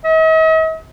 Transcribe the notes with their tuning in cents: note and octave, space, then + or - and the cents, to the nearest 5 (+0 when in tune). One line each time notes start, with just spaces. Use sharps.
D#5 +45